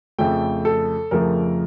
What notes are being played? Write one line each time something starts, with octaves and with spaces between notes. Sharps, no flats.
F2 C#3 F3 A3 G5
A4
F2 C#3 F3 A3 A#4